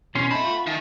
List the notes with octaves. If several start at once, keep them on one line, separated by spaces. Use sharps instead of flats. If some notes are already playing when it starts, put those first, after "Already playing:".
E2 B2 C#4 C6
C4 D#4 C5 E5 A5 B5
F4 F#4
D#3 E5 G#5 A5